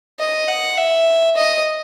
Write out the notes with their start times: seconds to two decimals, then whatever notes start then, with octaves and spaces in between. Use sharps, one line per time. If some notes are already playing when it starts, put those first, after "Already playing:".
0.20 D#5
0.48 F#5
0.77 E5
1.36 D#5